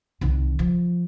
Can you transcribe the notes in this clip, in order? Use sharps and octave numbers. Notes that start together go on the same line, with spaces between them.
C2 D#3
F3